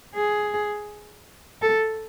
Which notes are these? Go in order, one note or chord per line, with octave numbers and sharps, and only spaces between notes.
G#4
A4